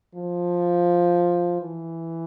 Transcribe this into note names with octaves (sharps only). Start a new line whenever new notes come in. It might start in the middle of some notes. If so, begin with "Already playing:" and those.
F3
E3